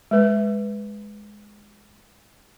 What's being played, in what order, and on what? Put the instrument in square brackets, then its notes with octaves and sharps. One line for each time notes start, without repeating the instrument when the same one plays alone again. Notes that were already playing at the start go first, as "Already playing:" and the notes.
[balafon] G#3 B4